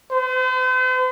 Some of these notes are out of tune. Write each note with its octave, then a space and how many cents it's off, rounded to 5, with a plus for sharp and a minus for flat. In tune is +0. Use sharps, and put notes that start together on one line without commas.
C5 -45